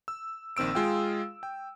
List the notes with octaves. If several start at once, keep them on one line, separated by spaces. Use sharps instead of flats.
E6
A#1 D#3 C4 E6 D7
G#3 F4 G#4 F5 G5
G5